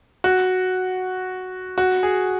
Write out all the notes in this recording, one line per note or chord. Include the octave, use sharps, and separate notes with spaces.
F#4
F#4
G#4